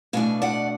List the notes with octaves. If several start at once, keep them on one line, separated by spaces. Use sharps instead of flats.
B2 A3 D4 F5 G#5
D5 F#5